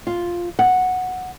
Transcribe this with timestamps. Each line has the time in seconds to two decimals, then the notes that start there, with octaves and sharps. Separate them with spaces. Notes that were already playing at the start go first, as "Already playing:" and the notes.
0.07 F4
0.59 F#5